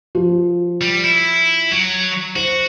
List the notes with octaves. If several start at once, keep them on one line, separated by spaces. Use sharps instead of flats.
F3
G3
E4
F#3
F#4 C5